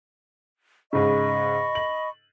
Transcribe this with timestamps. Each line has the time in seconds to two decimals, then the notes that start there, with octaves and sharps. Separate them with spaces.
0.93 G#2 C#3 D#5 B5 C#6
1.75 F#7